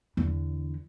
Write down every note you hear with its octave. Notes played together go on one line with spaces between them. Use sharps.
E2 D3